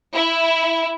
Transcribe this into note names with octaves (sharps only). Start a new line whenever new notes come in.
E4